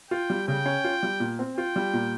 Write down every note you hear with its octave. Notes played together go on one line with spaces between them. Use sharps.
F4 G5
G3
C#3 G5
C#4
F4
G3
A#2
C4
F4 G5
G3
A#2